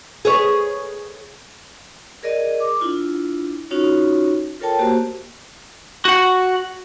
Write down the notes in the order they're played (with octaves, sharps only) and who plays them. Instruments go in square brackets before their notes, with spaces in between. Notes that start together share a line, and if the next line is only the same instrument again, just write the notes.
[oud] G#4 B4 C#5
[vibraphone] G#4 A#4 D5 D#5
D6
D4 E4 F4
C#4 D#4 F4 F#4 C#5
F4 A4 A#4 C#5 G5 A5
A#3 F#4 G4 C5
[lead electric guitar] F#4 F#5